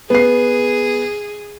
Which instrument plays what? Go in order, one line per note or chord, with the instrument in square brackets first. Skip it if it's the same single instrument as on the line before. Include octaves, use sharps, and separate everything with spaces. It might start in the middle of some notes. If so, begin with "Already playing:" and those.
[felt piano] B3 C7 [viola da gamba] G#4